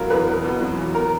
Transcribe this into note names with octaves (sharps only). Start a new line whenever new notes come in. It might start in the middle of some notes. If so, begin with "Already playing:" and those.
Already playing: E2 B2 F#3 F4 A#4
E2 B4
E2
B2
F#3
E2
A#4